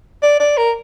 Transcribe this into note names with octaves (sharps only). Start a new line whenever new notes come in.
D5
D5
A#4